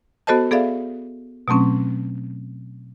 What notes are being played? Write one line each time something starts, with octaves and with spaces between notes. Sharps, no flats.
B3 F#4 A4 C5 D#5 A5
B3 G#4 A4 D5 E5 F5
B2 F#3 A3 C4 C#4